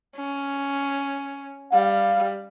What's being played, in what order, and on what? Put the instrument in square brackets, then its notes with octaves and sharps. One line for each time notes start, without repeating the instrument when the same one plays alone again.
[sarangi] C#4
[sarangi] G3 [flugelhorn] F5